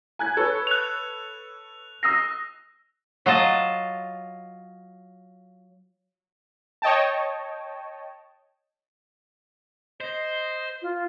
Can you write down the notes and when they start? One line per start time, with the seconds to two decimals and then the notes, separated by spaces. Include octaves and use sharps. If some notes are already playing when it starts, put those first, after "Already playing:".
0.19 G#5 F#6 G#6
0.37 A4 B4 C#5
0.67 F#6 F7
2.03 D#6 E6 A#6 C7
3.26 F#3 F4 D#5 A5
6.82 C#5 D#5 G5 A5
10.01 C5 D#5
10.82 F4